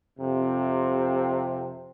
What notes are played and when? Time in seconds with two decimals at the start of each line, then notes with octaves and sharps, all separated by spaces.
0.19 F2 C3